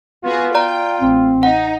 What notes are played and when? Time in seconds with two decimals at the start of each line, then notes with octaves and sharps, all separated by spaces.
0.24 B3 F4 F#4 G#4
0.55 D5 G5 A#5
1.01 A1 C4
1.43 D#4 F#5